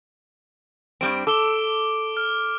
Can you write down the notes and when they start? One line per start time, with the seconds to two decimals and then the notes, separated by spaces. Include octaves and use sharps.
1.01 G2 G3 C4 D7
1.27 A4 D6 G7
2.17 F6